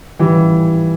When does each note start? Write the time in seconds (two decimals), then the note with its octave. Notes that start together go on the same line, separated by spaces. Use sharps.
0.19 E3 G3